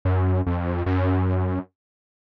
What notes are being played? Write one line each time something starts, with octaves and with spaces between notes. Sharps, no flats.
F#2
F2
F#2